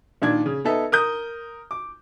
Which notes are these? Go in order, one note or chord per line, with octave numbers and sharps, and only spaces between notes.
A#2 D#3 D4 G#6
C#3
B3 D#4 A4 E5
A#4 D#6 G6
D6